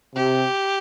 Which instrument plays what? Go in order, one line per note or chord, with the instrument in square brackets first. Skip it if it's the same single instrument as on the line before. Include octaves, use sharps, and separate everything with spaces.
[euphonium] C3 [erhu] G4